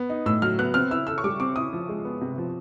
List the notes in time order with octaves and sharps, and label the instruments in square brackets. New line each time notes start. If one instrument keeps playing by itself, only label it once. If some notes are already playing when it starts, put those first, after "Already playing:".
Already playing: [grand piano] B3
D#4
[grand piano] A2 [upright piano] E6
[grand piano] F#3 [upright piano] F6
[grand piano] B3 [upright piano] F#6
[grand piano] C4 [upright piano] F6
[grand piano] E4 [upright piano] E6
[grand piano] A4 [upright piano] E6
[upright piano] C#6
[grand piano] G3 [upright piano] D6
[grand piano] C4 [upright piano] D6
[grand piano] E4 [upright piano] D#6
[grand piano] F3
G#3
B3
C3
F3